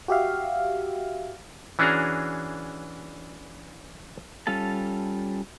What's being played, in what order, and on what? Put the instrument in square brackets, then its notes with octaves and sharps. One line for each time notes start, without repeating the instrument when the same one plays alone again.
[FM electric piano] F#4 G4 E5 F5
[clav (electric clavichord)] E3 C#4 D4 F#4 G#4 A#5
[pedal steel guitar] G3 C#4 F4 A4 A5